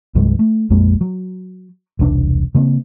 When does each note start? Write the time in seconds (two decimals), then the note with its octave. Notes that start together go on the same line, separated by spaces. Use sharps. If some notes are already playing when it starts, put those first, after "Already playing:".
0.15 C2 G2 F#3 G#3
0.39 A3
0.70 A#1 F2 G#3 A#3
1.01 F#3
1.99 E1 C2 C#4 D4
2.55 C#3 A#3 C4